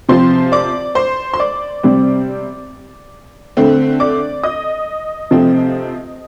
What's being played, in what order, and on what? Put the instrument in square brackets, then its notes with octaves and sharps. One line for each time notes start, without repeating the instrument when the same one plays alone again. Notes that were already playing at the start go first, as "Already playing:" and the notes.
[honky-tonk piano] C3 F3 C4 C5 C6
D5 D6
C5 C6
C6
D5 D6
C3 G3 C4
D3 A3 C4
D5 D6
D#5 D#6
C3 F3 A3 C4